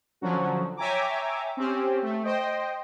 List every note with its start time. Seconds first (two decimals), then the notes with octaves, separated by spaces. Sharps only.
0.21 D3 F3 F#3 C#4 F#4
0.77 C#5 E5 G5 G#5 A#5 D6
1.57 C4 C#4 G4
2.02 A3
2.23 C5 D#5 G5